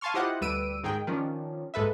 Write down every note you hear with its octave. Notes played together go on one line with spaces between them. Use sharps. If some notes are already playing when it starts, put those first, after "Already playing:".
F5 G#5 A5 C6 C#6 F6
E4 F4 G4 C5 D#5 F#5
D2 G3 B4 E6 D7 D#7
G#2 D#3 G#4 G5
D#3 F3 C#4 D4
A#1 G#2 A4 B4 E5